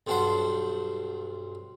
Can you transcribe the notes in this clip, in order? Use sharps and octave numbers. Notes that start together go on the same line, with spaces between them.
B1 G2 D4 F#4 C5 F#5